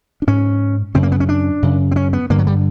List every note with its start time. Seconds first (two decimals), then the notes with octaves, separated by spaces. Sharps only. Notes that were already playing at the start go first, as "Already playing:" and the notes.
0.22 D4
0.27 G#2 C#4
0.94 F#2 C#3 C4
1.03 A#3
1.12 B3
1.20 C#4
1.29 D4
1.62 F#2 C#3
1.91 C4
1.96 C#4
2.13 B3
2.30 G2 D3 A#3
2.39 F#3
2.47 G3